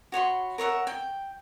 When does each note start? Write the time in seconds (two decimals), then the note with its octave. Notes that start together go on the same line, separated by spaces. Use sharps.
0.12 F#4 C#5 B5 C6
0.58 A#4 C#5 E5 F#5
0.87 G5